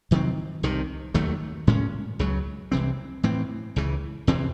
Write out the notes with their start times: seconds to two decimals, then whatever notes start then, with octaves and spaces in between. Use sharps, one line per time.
0.11 C3 D#3 F#3 C4
0.63 C2 C3 D#3
1.14 D#2 D#3 F#3 A3
1.67 A2 G#3 C#4
2.19 C#2 C#3 F#3
2.72 C2 C3 E3 C4
3.23 A2 E3 C4
3.76 C#2 C#3 E3
4.27 E2 C3 E3 C4